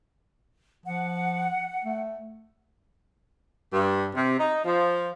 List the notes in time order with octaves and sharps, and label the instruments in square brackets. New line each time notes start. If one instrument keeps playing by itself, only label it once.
[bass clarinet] F3 [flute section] F#5
[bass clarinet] A3
[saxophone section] G2
C3
D#4
F3